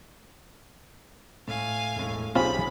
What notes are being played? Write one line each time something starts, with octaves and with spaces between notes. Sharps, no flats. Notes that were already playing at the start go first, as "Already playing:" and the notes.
A2 F5 G#5
E1 A2
B1 C4 C#4 F4 G4 G#4 B5